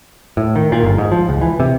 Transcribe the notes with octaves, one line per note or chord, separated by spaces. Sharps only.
A2
D#3
A#2
G1
G#2
F3
C#2
E3
C3